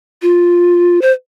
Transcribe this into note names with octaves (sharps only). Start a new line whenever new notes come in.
F4
C5